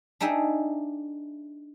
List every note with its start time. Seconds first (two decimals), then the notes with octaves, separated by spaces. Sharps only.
0.20 D4 D#4 G#4 E5 G5